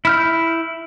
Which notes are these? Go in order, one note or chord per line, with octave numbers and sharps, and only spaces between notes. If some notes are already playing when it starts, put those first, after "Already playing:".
E4 F6 G6